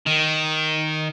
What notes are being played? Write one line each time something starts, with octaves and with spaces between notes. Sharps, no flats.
D#3